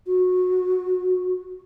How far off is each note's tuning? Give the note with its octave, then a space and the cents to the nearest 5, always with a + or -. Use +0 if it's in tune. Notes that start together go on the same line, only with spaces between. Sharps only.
F#4 -20